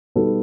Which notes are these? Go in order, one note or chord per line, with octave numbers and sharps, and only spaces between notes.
B2 G3 B3 D#4 A4